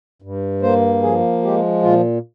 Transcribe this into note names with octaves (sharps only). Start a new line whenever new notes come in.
G2
A#3 C5
F3 G#4
G#3 G4
A#2 F4